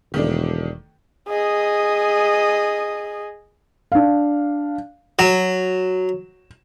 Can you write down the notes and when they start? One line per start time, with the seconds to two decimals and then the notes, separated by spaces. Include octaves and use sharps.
0.14 E1 D#3 A3 D4
1.28 G#4 D#5
3.92 D4 F5
5.19 F#3 E7